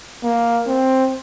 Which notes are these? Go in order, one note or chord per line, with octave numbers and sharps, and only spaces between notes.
A#3
C4